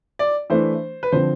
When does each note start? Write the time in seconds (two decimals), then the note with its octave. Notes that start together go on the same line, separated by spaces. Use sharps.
0.19 D5
0.50 E3 A3 D4 C5
1.03 B4
1.12 D3 F3 C4 C5